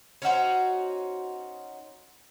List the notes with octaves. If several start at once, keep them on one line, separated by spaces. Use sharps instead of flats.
C#4 D#4 F#4 C5